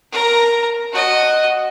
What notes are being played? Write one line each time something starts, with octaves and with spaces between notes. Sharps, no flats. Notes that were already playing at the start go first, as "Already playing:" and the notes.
A#4 A#5
F#4 D#5